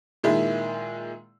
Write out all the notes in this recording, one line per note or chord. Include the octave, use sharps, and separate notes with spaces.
A#2 D#3 G#3 E4